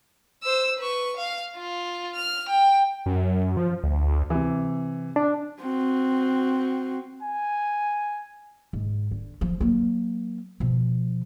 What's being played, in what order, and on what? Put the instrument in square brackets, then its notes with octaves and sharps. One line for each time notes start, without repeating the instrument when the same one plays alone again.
[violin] C5 E6
B4 C#6
F5
F4
F6
G5
[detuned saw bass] F#2
F3
D2
[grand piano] C3 E3
[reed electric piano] D4
[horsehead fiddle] C4 F#4
[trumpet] G#5
[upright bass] G#2
D3
F3
F#3 A#3
B2 F3